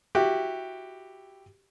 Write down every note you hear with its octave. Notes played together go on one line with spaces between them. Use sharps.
E4 F#4 G4